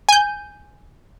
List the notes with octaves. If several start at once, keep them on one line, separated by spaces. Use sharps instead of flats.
G#5 G6